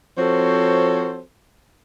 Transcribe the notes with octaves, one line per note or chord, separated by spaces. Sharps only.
F3 C4 F#4 A4 C5 C#5